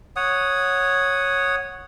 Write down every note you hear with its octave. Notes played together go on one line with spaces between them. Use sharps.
C#5 F#5 D#6